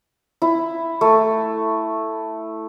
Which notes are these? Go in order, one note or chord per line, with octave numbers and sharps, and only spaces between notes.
E4
A3